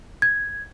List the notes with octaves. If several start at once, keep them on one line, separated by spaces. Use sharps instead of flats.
G#6